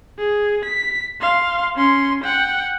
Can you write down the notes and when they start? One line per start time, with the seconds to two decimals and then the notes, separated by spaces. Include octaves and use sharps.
0.19 G#4
0.65 B6
1.21 F5 C6
1.76 C#4 C6
2.24 F#5 G5